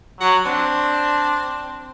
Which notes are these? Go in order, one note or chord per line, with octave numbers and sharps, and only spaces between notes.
F#3 F#4
C4 D4